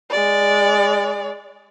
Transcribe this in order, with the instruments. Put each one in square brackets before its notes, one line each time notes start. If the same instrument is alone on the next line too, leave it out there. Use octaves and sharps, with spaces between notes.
[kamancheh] G#3 D5